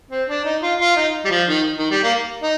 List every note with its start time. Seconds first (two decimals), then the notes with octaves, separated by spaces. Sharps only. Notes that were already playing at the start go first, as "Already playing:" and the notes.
0.11 C4
0.28 D4
0.45 D#4
0.62 F4
0.80 F4
0.96 D#4
1.25 G3
1.30 F3
1.48 D#3
1.78 D#3
1.91 G3
2.03 A#3
2.43 D#4